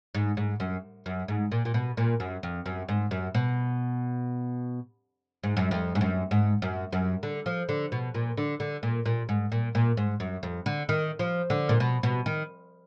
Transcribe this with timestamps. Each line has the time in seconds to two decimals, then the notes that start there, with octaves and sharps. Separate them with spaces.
0.15 G#2
0.37 G#2
0.60 F#2
1.06 F#2
1.28 G#2
1.52 A#2
1.65 A#2
1.74 B2
1.97 A#2
2.20 F#2
2.43 F2
2.66 F#2
2.89 G#2
3.11 F#2
3.35 B2
5.44 G#2
5.57 F#2
5.71 F2
5.95 G#2
6.01 F#2
6.31 G#2
6.62 F#2
6.93 F#2
7.23 D3
7.46 F3
7.69 D3
7.92 B2
8.14 A#2
8.37 D3
8.60 D3
8.83 A#2
9.06 A#2
9.29 G#2
9.52 A#2
9.75 A#2
9.97 G#2
10.20 F#2
10.43 F2
10.66 D3
10.89 D#3
11.19 F3
11.50 D3
11.69 A#2
11.80 B2
12.03 B2
12.26 D#3